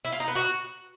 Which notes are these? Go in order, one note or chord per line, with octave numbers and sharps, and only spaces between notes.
E4
F4
D#4
B3
F#4